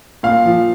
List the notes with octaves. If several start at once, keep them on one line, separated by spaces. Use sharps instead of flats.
A#2 F5
F3